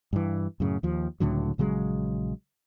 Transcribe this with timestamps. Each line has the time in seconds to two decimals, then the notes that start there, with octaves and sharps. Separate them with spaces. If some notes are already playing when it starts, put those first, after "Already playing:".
0.13 G2 E3
0.60 F#2 A2 C#3
0.83 D#2 F3
1.20 C#2 A2 D3 F#3
1.58 A#1 C#3 F#3 G#3